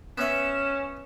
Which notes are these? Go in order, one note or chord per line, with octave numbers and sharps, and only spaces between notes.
B3 C#4 E5 E7